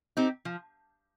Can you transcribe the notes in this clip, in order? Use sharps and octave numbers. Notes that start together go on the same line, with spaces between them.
C4 D#4 G4
F3